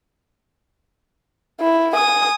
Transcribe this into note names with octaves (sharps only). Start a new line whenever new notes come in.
E4
G#5 D#6